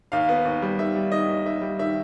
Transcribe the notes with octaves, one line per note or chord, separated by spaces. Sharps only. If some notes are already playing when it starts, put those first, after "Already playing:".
D#2 F5
B3
D#2
G3
D#3 E5
G3
D#3 D#5
D#2
D#3 E5
G3
D#3 E5